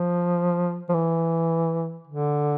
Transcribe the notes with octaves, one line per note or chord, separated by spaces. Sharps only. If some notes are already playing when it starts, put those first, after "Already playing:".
Already playing: F3
F3
E3
D3